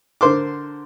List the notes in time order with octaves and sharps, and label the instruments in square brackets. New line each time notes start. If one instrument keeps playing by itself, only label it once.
[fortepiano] D3 A#4 C5 C6 D6